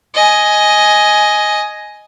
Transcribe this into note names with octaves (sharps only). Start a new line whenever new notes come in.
D#5 G#5